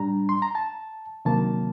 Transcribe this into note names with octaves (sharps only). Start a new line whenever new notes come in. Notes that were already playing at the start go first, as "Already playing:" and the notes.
Already playing: A2 G3 D4 A#5
C6
A#5
A5
D2 C3 D#3 F#3 A#3 A5